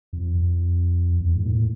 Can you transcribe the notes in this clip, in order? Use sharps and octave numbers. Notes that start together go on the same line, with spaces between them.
F2
F2
E2
G#2
A#2
A2